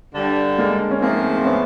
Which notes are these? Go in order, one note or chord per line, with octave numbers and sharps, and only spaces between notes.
G2 D3 G3
G#3 A#3
C#4
G#2 F3 A3 A#3 C4
C4
B3 C#4